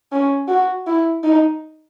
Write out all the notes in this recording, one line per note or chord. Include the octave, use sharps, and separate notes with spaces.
C#4
F#4
E4
D#4